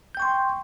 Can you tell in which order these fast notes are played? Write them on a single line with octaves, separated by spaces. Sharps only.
G6 G5 C#6 C6